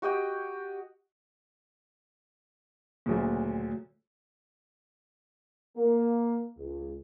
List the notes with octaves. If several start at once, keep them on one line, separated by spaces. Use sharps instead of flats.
F#4 G4 D#5 G5
D2 A#2 C#3 F#3 A3
A#3
C#2